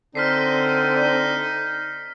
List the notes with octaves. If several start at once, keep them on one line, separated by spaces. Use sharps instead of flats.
D3 C4 D4 D#4 F6 B6 C7